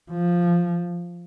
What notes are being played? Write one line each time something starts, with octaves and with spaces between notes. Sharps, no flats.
F3